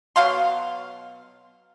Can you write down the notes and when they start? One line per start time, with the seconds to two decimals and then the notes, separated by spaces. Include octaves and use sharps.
0.16 B2 F#3 F5 C6